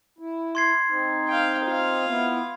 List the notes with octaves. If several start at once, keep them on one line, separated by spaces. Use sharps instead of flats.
E4
C6 G#6 C7
C4 D#4
F5 G5
F4 F5
B3 E4